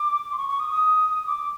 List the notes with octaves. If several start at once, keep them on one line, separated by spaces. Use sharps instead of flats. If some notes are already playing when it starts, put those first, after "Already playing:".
Already playing: D6
C6
C#6
C#6
D#6
D#6
D6